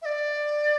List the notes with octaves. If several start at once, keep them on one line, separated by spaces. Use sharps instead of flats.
E5
D5